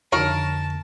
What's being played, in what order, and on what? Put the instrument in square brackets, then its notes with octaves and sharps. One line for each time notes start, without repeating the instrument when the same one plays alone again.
[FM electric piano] F2 D3 [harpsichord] D#4 F#4 C#5 [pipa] A#4 [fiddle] A5